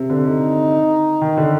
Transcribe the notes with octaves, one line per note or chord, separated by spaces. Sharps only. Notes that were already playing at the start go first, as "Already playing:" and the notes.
Already playing: C3
D3
D#4
D#3
D3